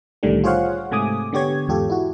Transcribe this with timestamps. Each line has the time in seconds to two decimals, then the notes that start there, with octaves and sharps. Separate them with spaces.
0.23 C2 A2 D3 D#3 G3 A3
0.44 F4 G#4 C5 C#5 F5 F#5
0.91 G#2 C3 A3 G#5 D6 D#6
1.32 D3 B3 G4 C#5 G#6
1.68 E2 G#2 F4 G4 A4
1.90 E4 F#4